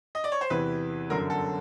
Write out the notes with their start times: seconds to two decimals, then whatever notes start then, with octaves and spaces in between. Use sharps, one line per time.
0.15 D#5
0.24 D5
0.32 C#5
0.41 C5
0.50 E2 C3 E3 B4
1.10 G1 F#2 D3 F#3 A#4
1.30 A4